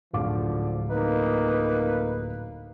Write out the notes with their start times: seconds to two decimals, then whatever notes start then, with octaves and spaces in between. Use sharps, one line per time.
0.13 D1 G#2 D3 F3 F5 D6
0.89 F2 A#3 D#4 B4